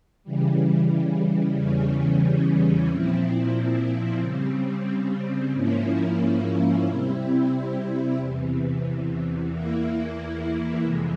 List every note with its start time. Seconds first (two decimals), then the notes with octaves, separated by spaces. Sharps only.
0.23 C#3 E3 G3
1.55 E2 C#3 E3 G3 C#4
2.88 A#2 F3 C4 E4
4.20 C#3 G3 C4
5.53 G#2 F3 A#3 C#4 E4
6.86 C3 G3 C4 E4
8.18 E2 C3 E3
9.50 E2 E3 A#3 E4
10.83 F2 C3 E3 G#3